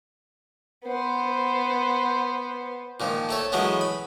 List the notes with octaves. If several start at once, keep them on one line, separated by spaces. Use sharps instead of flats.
B3 C5
A#2 D#3 F3
A3 A4 C#5
E3 F#3 G#3 A3 B3 C#4
B5